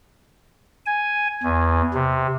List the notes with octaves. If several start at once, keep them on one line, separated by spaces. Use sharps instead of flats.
G#5
E2
C3